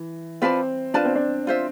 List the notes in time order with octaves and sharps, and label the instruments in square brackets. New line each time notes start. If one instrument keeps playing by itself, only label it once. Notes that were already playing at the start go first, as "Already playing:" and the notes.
Already playing: [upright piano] E3
[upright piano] C4 [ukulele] F4 B4 D5 A5
[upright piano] D4 [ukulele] F4 B4 D5 A5
[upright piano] C4
D4
[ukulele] F4 C5 E5